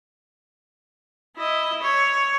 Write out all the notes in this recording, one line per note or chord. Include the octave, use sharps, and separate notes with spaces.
E4 D#5
C#5